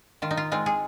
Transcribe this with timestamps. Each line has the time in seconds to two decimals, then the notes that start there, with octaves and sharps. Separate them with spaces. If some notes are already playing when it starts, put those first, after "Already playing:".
0.22 D#3 F4
0.31 D#4
0.37 F4
0.52 G#3 C4 F4
0.66 G#4